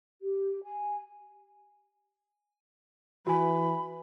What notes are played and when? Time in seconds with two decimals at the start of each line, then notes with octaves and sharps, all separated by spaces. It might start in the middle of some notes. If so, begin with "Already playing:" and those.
0.22 G4
0.64 G#5
3.27 E3 F#4 G#5 B5